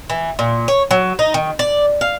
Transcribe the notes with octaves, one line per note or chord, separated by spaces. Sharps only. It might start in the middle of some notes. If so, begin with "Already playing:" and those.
E3
A#2
C#5
F#3
D#4
D#3
D5
F5